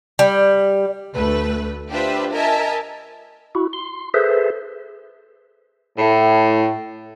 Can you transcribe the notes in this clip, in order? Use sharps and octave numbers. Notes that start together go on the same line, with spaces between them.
G3
D2 A3 B4
D4 F4 G4 B4 C5 E5
A#4 D#5 E5 G#5 A5
E4 F#4
C6
G#4 A4 B4 C5 E5
A2